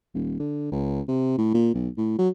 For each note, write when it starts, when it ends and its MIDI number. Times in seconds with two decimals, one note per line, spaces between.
0.14 0.36 27
0.40 0.68 50
0.72 1.01 37
1.08 1.35 48
1.38 1.52 45
1.54 1.70 46
1.74 1.89 35
1.97 2.18 45
2.19 2.29 54